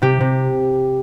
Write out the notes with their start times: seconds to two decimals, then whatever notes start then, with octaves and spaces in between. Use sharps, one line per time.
0.02 C3 G4
0.20 C3